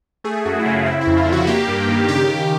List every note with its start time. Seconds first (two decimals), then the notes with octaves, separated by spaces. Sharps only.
0.24 A3 G#4
0.45 F#2 F#4
0.59 E4
0.66 C#3 F4
0.86 C4 E4
1.01 E4
1.07 F2
1.17 F4
1.27 D3
1.32 F#4
1.47 A#3 G4
1.68 G2
1.88 D#3
2.08 C#3 G4
2.29 C#3